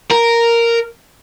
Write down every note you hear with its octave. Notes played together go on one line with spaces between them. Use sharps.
A#4